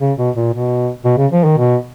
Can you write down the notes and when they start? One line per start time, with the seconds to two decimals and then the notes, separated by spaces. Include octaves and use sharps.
0.01 C#3
0.18 B2
0.36 A#2
0.54 B2
1.05 B2
1.18 C#3
1.32 F3
1.44 D#3
1.58 B2